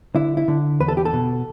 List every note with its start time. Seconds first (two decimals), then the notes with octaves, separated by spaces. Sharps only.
0.15 D3 E4
0.37 E4
0.48 D3
0.80 E2 B4
0.88 A4
0.97 G4
1.05 A4
1.13 B2